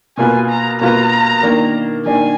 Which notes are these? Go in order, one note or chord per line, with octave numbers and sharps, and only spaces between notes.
B2 A#3 F4 B4 G#5
A#5
B2 A#3 F4 B4 A#5
D#3 A#3 D4
D#3 A#3 D4 G#5